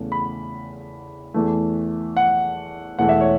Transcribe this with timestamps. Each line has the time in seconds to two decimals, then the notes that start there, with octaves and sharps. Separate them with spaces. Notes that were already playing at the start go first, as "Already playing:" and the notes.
Already playing: E2 C#3 A3
0.12 B5
1.34 E2 E3 A3
2.17 F#5
2.98 E1 E2 E3 A3 F#5
3.09 E5
3.21 C#5